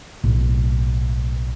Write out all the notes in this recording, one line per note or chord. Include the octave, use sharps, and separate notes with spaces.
B1 A2